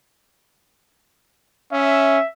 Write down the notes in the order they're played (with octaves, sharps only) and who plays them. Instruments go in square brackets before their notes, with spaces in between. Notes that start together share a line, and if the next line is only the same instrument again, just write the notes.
[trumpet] C#4 [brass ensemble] E5